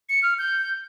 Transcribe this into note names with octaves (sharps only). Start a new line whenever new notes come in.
C#7
F6
G6